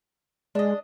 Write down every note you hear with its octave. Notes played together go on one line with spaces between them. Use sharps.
G#3 D4 D#5